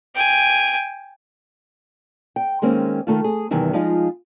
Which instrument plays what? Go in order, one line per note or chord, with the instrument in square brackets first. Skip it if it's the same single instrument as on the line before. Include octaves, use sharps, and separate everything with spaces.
[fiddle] G5 G#5
[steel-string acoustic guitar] G5
D#3 G#3 A#3 C4 C#4
D#3 A3 F4
G#4
E2 G2 C3 D#3 E3
F3 G#3 D#4 F4 G#4